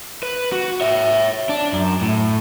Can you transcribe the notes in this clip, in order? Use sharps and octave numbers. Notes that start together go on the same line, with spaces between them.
B4
F#4
C#5 E5
D4
F#2
A2